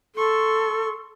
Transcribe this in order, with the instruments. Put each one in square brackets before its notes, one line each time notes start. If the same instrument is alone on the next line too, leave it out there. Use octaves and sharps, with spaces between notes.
[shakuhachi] A4 [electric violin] C6 C#6